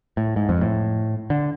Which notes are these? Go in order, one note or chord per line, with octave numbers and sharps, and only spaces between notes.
A2
G#2
F2
A2
D3